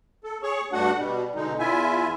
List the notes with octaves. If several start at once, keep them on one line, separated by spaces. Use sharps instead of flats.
A4
G#4 C#5 C#6
G2 A3 D4 F#4 F#5
B2 G3
B2 D3 G#3 D#4
E2 E4 F4 E5 G#5